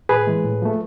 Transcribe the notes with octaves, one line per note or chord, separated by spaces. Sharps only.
A2 G#4 B4
E3 G#3
A2
F3 A3